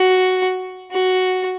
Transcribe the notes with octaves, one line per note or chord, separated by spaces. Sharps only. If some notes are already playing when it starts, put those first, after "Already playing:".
Already playing: F#4
F#4